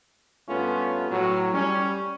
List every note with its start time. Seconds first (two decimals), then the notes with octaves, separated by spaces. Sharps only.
0.47 G2 A3 B3 C#4 F4
1.10 A2 F#3
1.53 G3 C#4